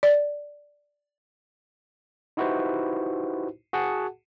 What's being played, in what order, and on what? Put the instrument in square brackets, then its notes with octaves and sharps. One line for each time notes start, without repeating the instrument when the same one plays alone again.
[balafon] D5
[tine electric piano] D#4 E4 F#4 G4 B4 C5
F#4 G#4 F#5 A5